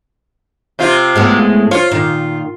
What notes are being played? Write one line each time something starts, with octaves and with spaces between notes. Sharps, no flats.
C3 C4 F4
A2 G#3 B3
F4 C#5
A#2 D#3